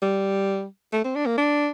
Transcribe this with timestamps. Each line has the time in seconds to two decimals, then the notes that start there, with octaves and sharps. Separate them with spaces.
0.02 G3
0.93 A3
1.04 C4
1.16 D4
1.26 A#3
1.38 D4